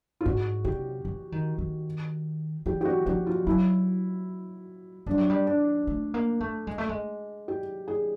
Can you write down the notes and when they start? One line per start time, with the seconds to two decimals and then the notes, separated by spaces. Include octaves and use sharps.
0.21 F4
0.25 G#2 F#4
0.65 C3 G4
1.05 E3
1.32 D#3
1.58 D#3
2.66 E3 G4
2.81 G4
2.85 F#4
3.06 F3 F#4
3.27 F4
3.47 F#3 E4
5.06 G3 D4
5.18 F#3
5.30 G3
5.47 D4
5.87 A3
6.14 A#3
6.40 A3
6.67 G#3
6.78 A3
6.89 G#3
7.48 G4
7.88 G#4